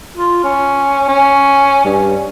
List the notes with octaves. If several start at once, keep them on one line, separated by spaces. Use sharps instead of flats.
F4
C#4
C#4
G2